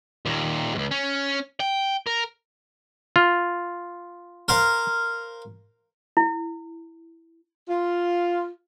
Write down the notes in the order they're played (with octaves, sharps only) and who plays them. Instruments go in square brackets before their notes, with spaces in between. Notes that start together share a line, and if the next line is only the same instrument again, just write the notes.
[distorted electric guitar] D#2 A#2
C#2 G#2
C#4
G5
A#4
[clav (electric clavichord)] F4
[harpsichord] A#4 C5 F5
[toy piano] E4
[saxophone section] F4